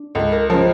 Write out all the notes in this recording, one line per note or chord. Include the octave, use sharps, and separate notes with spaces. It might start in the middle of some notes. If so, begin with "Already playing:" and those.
Already playing: D4
C#2 A4
A#4
C#3 F3 A#4